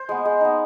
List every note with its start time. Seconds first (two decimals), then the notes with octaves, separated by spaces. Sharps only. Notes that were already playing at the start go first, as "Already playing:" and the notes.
Already playing: C5
0.09 G#3 B3
0.25 G#3
0.41 B3 D#4